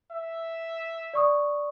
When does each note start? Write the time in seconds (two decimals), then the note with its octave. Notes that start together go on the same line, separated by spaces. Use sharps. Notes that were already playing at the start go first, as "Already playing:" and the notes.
0.11 E5
1.14 D5 C#6 D#6